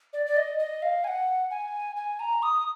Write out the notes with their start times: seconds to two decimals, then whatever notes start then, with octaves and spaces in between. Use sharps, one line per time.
0.13 D5
0.26 D5
0.36 D#5
0.59 D#5
0.82 F5
1.04 G#5
1.07 F#5
1.51 G#5
1.96 G#5
2.20 A#5
2.43 D#6